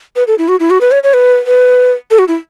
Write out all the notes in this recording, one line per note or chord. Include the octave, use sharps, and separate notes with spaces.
B4
A4
E4
F#4
E4
F#4
B4
C#5
C#5
B4
B4
A4
F#4
E4